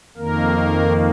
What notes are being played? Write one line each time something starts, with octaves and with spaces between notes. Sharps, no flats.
F2 D#3 A#3 A#4